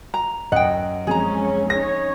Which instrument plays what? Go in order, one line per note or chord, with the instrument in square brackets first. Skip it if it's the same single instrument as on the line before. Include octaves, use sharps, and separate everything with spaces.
[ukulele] A#5
[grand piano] F#2 [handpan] D#5 [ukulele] F#5 G5
[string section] C#3 G#3 C#4 [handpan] F3 C4 [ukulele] G#4 A#5
[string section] C#4 D#4 C#5 [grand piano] A#6